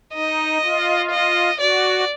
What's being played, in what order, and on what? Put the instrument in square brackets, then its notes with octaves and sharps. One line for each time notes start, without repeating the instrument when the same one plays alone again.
[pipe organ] D#4 [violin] D#5
[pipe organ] F4
[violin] D#5
[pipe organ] F#4 [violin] D5